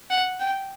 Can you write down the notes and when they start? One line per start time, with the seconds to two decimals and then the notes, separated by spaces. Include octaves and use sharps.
0.10 F#5
0.40 G5